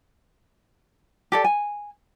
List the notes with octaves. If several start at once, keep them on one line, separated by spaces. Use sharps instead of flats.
G4 A4 D5
G#5